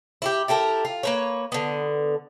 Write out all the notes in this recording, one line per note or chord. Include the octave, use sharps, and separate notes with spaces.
E4 F#4 G4
E4 G4 A4 A#4
F4
A#3 B4 C#5
D3 B3